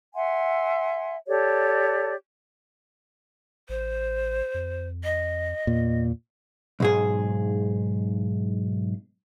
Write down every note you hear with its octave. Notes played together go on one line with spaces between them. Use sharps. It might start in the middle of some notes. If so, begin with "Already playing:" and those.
E5 F#5 G#5 C6
G4 A4 C#5 D5
A1 C5
F2
D#5
E2 A#2
B1 G#2 G#4